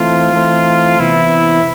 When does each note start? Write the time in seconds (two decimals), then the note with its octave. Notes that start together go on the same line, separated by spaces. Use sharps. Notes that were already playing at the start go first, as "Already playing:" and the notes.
Already playing: E3 A3 C4 F4
0.33 E3 A3 C4
1.00 C3 E3 B3 E4